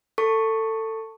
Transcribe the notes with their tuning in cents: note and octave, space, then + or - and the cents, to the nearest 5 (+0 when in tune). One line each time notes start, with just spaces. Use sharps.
A4 +20 A5 +15 C#6 +0